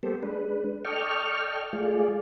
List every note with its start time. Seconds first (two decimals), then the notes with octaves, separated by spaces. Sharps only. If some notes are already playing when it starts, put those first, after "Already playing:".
0.03 G3 A#3 B3 G4 A4 C5
0.23 G#3 D4 B4
0.85 A4 D5 D#5 G5 C#6 F6
1.73 G#3 A3 F4 G#4 D5